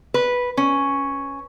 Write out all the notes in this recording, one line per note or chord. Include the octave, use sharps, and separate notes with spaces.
B4
C#4